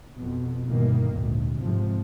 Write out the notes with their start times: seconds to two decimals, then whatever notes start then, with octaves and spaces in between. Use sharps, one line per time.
0.14 F2 B2
0.67 D2 G2 B2 D#3 E3 A#3
1.08 G#1 D2 A#2
1.58 G#2 C3 F3